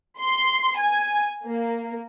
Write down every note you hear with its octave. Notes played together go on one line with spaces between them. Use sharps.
C6
G#5
A#3